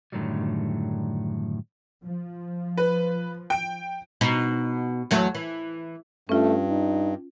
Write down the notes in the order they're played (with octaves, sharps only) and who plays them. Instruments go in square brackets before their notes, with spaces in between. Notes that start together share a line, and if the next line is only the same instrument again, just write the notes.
[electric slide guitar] F#2 A2 D3 D#3 F#3 G3
[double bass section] F3
[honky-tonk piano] B4
G5 D7
[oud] B2 D#4
E2 F#3 A3
E3
[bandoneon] G2 [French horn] A3 [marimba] C#4 F4
[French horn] D#4